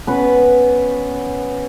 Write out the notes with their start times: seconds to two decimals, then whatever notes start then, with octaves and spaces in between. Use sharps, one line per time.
0.07 B3 C#4 B4 B5